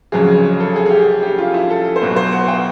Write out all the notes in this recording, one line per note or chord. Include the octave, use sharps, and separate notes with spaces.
F1 F2 C#3 F#3 G#4
A4
G#4
G#4
G4
G4
F4
E4
A4
C5
B1 B2 F#3 B4
C5
F#5
G5